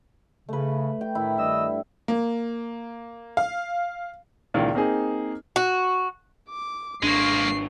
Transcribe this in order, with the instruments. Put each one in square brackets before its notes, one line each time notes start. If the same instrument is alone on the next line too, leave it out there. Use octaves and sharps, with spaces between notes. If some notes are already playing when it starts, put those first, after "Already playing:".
[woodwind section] C#3 [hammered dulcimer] A3 B4
[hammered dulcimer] G5
[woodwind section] A2 D#3 [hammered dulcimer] E4
[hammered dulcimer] G2 [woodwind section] D#3 D#5 E6
[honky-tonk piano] A#3
F5
[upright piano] C#2 A#2 D#3 E4 F5
A#3 C4 D#4 G#4
[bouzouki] F#4
[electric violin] D6
[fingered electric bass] G#1 D4 [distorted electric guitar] G#3 A#3 [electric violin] C#6 C7